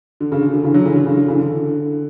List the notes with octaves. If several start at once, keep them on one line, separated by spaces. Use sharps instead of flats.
D3
C#3
D3
D3
C#3 E3
D3 F#3
C#3 E3
D3
C#3
D3
C#3 E3
D3